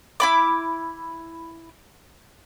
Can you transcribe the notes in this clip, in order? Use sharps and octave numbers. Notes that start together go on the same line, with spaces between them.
E4 B5 D6